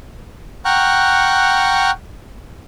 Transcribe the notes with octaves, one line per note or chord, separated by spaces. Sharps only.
F#5 G5 A#5 C#6 F6 F#6